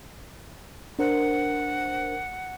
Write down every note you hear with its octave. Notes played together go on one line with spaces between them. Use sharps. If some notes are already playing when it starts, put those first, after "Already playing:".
D4 A#4 C5 F#5